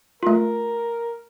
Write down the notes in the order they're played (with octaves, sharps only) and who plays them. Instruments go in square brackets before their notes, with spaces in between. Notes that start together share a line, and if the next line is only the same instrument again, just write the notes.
[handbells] A3 F4 [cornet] A#4